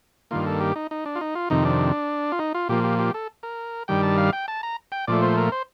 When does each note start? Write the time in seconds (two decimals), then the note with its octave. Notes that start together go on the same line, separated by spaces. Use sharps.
0.31 G2 D#3 A#3 F4
0.46 A4
0.61 G4
0.76 D#4
0.91 D#4
1.06 D4
1.15 F4
1.21 D#4
1.35 F4
1.50 F2 C3 D#3 D#4
1.65 D4
2.32 F4
2.39 D#4
2.55 F4
2.69 A#2 F3 A#3 G4
2.84 G4
2.99 G4
3.14 A4
3.43 A#4
3.88 G2 D#3 G3 G5
4.03 A5
4.18 F5
4.33 G5
4.48 A5
4.63 A#5
4.92 G5
5.07 A#2 F3 A3 D5
5.22 C5
5.38 A#4
5.52 C5